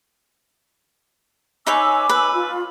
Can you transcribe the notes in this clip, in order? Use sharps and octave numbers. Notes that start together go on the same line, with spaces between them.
D#4 B4 C#5 G#5 D6 E6
B4
F4